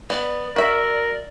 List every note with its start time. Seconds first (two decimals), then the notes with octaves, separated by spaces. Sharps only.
0.10 B3 D5
0.56 F#4 A#4 E5